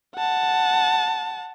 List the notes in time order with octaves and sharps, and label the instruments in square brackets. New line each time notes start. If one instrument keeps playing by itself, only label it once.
[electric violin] F#5 A5